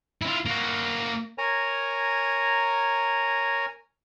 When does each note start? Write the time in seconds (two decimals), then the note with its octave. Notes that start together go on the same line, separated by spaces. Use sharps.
0.22 E4 F4
0.45 A#3 F#4
1.38 A#4 C#5 G#5 A#5